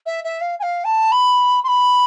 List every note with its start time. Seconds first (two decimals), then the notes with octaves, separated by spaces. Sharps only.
0.06 E5
0.24 E5
0.41 F5
0.59 G#5
0.63 F5
0.84 A5
1.12 B5
1.64 C6
1.68 B5